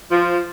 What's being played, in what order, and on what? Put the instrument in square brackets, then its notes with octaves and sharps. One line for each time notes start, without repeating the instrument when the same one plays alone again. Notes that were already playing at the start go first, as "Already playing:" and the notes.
[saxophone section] F3